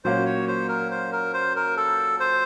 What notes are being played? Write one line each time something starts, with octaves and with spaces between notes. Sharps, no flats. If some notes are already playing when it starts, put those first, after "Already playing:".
A#2 F#3 A#3 C#4 C5
C#5
C5
A#4
C5
A#4
C5
A#4
A4
C5